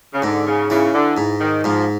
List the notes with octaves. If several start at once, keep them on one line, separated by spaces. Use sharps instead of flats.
C#3
G#2 D3
C#3
C#3 E3
D3
G#2
D#3
G#2 F3